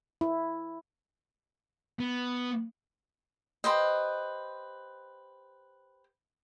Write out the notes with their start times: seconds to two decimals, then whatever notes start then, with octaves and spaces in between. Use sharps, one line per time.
0.21 E4
1.99 B3
3.64 G4 B4 C5 D#5